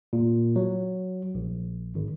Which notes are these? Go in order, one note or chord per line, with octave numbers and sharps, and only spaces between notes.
A#2
F#3
A#1
G#1